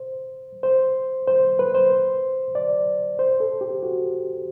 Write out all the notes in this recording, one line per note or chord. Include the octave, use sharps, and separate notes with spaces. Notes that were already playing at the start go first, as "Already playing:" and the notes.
Already playing: C5
C5
C5
B4
C5
D5
C5
A4
G4
F#4